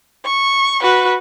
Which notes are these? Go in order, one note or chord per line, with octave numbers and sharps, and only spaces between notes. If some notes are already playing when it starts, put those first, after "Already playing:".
C#6
F#4 B4